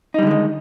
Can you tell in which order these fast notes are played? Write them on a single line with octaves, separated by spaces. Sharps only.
D#4 G3 D3 G#3 D#3